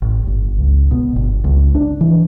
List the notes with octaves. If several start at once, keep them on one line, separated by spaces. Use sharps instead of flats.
A1
G1
C#2
B2
G1
C#2
D4
E3